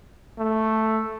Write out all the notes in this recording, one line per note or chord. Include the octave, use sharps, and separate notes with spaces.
A3